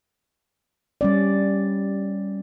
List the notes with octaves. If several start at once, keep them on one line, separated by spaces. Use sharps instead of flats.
G3 C#4 D5